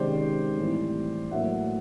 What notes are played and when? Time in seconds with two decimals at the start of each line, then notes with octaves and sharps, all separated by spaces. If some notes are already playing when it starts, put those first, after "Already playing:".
Already playing: C3 D#3 G#3 C#4 C5 D5
0.58 A2 E3 G3 C4
1.31 A2 F#3 A#3 E5 F#5